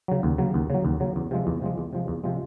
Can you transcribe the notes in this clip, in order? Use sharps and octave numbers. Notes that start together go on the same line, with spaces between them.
C#3 F#3
D#2
C#3 F#3
D#2
C#3 F#3
D#2
C#3 F#3
E2
C3 F3 G#3
E2
C3 F3 G#3
E2
C3 F3 G#3
E2
C3 F3 G#3